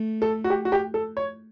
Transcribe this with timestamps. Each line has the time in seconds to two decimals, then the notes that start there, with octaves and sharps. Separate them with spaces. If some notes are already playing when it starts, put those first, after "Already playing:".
Already playing: A3
0.22 A4
0.44 F#4
0.50 G4
0.65 F#4
0.72 G4
0.94 A4
1.17 C#5